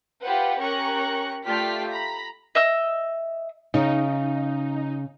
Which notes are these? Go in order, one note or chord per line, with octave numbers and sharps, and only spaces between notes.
F4 G4 B4 C5 F#5
C#4 G4 A#4 A#5 C#6 F#6
A3 F4 G4 D5 F6 B6
A#5 B5 B6
D#5 E5 E6
C#3 D#4